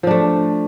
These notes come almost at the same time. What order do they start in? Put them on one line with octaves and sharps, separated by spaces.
F3 D4 A3